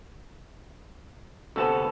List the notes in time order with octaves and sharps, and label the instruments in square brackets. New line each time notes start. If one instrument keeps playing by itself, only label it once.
[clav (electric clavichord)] D2 C3 B3 [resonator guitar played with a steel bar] A4 A5